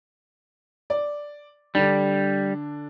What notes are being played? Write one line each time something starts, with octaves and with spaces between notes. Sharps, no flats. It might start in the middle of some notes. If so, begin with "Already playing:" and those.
D5
D3 G3 D4